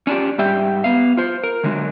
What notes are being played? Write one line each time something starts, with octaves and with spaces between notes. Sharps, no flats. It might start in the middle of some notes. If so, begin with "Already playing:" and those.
C#4 D4 E4 F4 G4
G#2 G3 G4 E5 G5
B3 F5
F4 C5
A#4
D3 F#3 G#3 D4